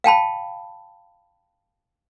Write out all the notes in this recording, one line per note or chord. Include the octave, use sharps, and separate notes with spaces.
F5 G5 A5 B5